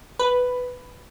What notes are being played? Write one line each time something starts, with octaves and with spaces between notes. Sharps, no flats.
B4